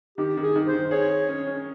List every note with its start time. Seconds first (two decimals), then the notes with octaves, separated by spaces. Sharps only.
0.18 D#3 G4
0.37 D#3
0.43 G#4
0.55 D#3
0.67 C5
0.73 D#3
0.91 G#4 C#5
1.10 G#4
1.29 C#4
1.47 C#4